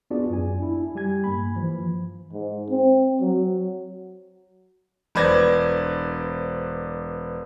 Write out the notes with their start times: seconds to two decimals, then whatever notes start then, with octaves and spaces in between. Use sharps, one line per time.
0.11 B3 D4 F4 F#4 G#4 D5
0.30 F#2 G#5
0.59 D4 E4
0.95 G3 G4 G#5 G#6
1.24 G2 A#3 B5
1.56 E3 F3
2.33 G#2
2.70 C4
3.21 F#3
5.15 E1 B4 C5 D5 G#6 A#6